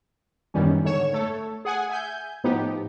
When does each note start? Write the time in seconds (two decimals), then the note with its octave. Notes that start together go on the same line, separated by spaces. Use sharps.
0.54 F#2 B2 D#3 E3 G3 C#4
0.84 G#2 D3 C#5 E7
1.13 A3 A4 C#5
1.65 G#4 F#5 G#5
1.90 E5 G#5 G6
2.44 A2 F3 B3 D#4 G4